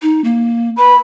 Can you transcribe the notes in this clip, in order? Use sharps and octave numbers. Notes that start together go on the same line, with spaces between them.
D#4
A#3
B4 B5